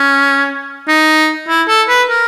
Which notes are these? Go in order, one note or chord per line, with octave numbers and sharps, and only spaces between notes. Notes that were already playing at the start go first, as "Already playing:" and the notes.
Already playing: C#4
D#4
E4
A4
B4
A#4